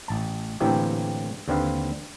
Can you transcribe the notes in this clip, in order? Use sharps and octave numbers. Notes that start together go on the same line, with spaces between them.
A1 A5
A2 D3 E3 A#3 C4 G4
D#2 D3 C4 B4 F5